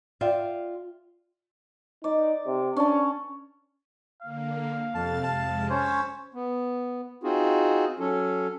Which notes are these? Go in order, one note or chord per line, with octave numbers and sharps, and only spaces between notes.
F4 D5 E5 F5 G5
D#4 D5
C3
C#4 D4 A5
D3 A#3 F5
F2 C3 C4 A5 A6
F2 C3 G#3 A5
C#4 C5 C#5 E6 A6 B6
B3
C4 D#4 F4 F#4 G#4
F#3 C#4 A4